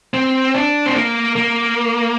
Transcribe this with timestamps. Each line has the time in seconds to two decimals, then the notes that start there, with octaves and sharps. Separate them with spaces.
0.14 C4
0.54 D4
0.86 C4
0.95 A#3
1.36 A#3